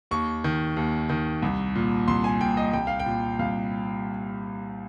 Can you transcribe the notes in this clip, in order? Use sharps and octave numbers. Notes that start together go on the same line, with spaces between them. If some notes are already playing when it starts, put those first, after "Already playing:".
D#2 C#6
D#3
D#2
D#3
C2
A#2
C2 C6
G#5
A#2 G5
D#5
C2 G5
F5
G5
A#2
C2 F5